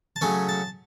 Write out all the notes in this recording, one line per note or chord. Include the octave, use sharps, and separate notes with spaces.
A5
C#3 F#3 A3 C#4 G#5
A5